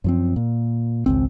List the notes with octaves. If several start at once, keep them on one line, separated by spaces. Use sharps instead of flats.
F#2 F3 C4
A#2
G#1 C#2 C4